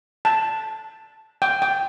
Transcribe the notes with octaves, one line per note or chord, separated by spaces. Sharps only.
A5
G5
G5